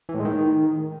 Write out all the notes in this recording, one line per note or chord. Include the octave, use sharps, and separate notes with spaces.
E3
A2
G#3
D#3